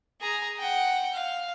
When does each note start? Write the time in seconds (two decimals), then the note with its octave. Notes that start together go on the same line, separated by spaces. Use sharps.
0.21 G#4 A#5
0.59 F#5 G5
1.13 F5